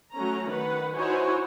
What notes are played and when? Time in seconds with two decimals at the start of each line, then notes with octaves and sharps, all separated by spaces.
0.13 F#3 A3 C#4 A#5
0.49 D#3 B4 F#5
0.96 D#4 E4 F#4 C5 C#5 G#5